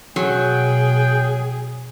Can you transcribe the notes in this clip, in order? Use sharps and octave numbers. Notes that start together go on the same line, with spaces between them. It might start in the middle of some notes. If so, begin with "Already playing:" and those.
B2 F#3 G#4 G5